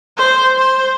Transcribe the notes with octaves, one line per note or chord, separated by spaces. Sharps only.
C5
C5